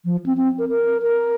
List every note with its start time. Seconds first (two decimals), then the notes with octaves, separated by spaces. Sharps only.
0.05 F3
0.26 C4
0.37 C4
0.59 A#4
0.69 A#4
1.02 A#4